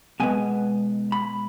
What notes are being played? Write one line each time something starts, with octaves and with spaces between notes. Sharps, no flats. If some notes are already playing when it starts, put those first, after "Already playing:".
B2 G#3 B3 G#5
B5